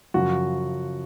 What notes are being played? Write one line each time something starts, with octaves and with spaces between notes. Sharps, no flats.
F#2 C#3 F3 F#4